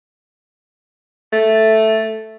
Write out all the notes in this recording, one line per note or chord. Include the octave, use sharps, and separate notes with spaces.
A3